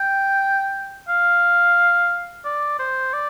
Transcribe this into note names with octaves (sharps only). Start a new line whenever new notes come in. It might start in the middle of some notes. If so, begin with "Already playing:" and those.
Already playing: G5
F5
D5
C5
D5